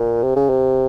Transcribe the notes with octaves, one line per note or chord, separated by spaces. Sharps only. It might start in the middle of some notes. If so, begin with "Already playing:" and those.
Already playing: A#2
C3
C#3
C3